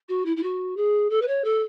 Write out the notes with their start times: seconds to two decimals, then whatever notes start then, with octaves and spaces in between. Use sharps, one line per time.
0.08 F#4
0.25 E4
0.36 E4
0.42 F#4
0.76 G#4
1.09 A4
1.21 B4
1.27 C#5
1.44 A4